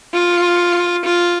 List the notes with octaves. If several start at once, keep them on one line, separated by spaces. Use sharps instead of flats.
F4
F4